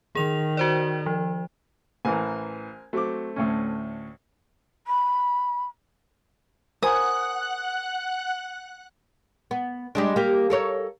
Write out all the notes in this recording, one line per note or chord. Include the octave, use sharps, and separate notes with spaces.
D#3 G#4 F7
F#4 C5 D5
F3
A1 E3 A#4 C5 G#5
F#3 A3 C4 D6
D2 A2 C#4
B5
A#4 C5 F#5 G#5 D#6 F#6
B3
G3 G#3 D4
A#3 G4
A4 A#4 C#5